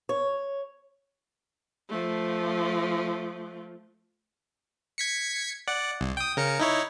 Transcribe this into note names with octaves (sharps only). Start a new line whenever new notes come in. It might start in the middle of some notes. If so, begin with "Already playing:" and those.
C#5
F3 A3
G#6 B6 C#7
D5 F#5
C2
G5 D#6
C#3 A#4 C#7
D#4 E4 C#5